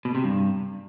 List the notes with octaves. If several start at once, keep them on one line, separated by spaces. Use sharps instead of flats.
B2
C3
G2